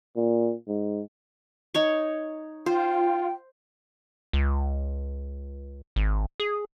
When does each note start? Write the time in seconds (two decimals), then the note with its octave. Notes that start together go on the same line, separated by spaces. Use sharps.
0.16 A#2
0.68 G#2
1.74 D#4 C#5 C#6
2.66 F4 C5 G5
4.33 C#2
5.96 G#1
6.40 G#4